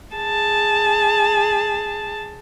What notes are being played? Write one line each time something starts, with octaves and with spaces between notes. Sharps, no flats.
G#4 A5